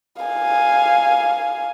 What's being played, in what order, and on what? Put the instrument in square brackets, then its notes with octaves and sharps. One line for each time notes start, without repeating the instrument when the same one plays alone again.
[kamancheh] F5 G#5